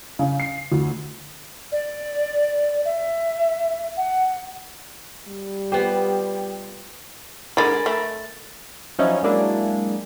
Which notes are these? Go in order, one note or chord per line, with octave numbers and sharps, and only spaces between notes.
C#3
C7
D2
D5
E5
F#5
G3
B3 F4 G4 C5
D3 G#3 A#4 B5 A6
A3
F3 F#3 C#4 D#4 E4
F#3 G#3 A#3 D4 E4 G#4